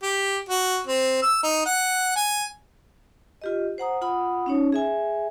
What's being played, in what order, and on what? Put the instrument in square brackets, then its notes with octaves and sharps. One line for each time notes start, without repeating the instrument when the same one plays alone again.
[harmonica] G4
F#4
C4
E6
D#4
F#5
G#5
[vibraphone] F4 G4 D#5
C5 F#5 A#5 D#6
F4 F#5 B5 D#6
C#4 D#4 C#5
G#4 E5 G#5